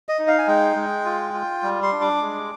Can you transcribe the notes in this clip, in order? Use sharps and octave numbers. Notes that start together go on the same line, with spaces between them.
D#5
D#4
F5
G#5
G#3 G5
G#3
F4
F4
G3
C6
D4
D6
G#3